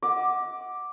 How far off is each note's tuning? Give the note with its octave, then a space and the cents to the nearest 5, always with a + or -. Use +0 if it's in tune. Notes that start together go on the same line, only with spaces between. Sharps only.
D#5 +40 F#5 +0 D6 +0